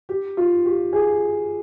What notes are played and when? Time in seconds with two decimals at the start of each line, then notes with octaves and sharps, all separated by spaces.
0.09 G4
0.37 F4
0.65 G4
0.93 G#4